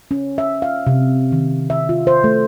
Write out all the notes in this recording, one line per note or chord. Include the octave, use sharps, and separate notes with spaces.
C#4
E5
F5
C3
D#3
E5
F4
C5
A3